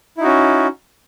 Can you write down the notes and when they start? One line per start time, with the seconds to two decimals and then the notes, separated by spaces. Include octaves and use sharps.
0.18 E4
0.20 D#4
0.23 F#4
0.25 C#4